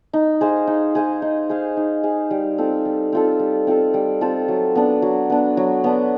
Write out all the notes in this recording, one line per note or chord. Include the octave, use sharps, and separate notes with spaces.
D#4
G#4 C5 F5
D#4
G#4 C5 F5
D#4
G#4 C5 F5
D#4
G#4 C5 F5
G3
C4 F4 A4
G3
C4 F4 A4
G3
C4 F4 A4
G3
C4 F4 A4
F#3
B3 D4
F#3
B3 D4
F#3
B3 D4